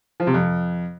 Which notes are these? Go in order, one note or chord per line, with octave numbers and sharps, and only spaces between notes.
F3
C3
F2